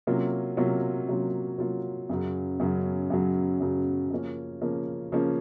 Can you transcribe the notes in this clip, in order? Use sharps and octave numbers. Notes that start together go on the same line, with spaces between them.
C3 F#3 A#3 C#4 F4
C3 F#3 A#3 C#4 F4
C3 F#3 A#3 C#4 F4
C3 F#3 A#3 C#4 F4
F#2 C#3 F#3
F#2 C#3 F#3
F#2 C#3 F#3
F#2 C#3 F#3
C#3 F3 A#3 C#4
C#3 F3 A#3 C#4
C#3 F3 A#3 C#4